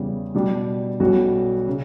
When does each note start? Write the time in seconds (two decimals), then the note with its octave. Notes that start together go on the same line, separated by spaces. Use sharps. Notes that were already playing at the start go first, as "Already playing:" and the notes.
Already playing: E2 C#3 G3
0.34 B2 G3 D4 G4
1.00 B1 B2 G3 C#4 F#4
1.67 C#3